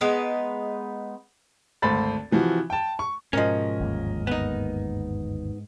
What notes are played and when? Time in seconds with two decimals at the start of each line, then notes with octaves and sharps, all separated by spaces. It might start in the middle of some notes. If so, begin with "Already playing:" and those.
0.01 G#3 B3 D#4 B4
1.82 G#1 D2 A4 C5 B5 A6
2.31 C3 E3 F3 F#4
2.70 G5 A5
2.99 C#6
3.33 G#2 B2 F3 C#4 A#4 D#5
3.80 G1 D#2 A#3
4.27 B3 D#4